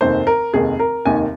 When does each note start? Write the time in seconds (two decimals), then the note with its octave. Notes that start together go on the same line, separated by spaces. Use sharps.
0.01 F1 D#2 D#3 C5
0.27 A#4
0.53 F1 D#2 D#3 G#4
0.79 A#4
1.05 F1 D#2 D#3 G#5